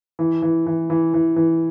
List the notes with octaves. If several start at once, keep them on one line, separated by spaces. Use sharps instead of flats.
E3
E3
E3
E3
E3
E3